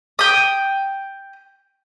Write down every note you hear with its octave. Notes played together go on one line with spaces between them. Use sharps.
G5 D#6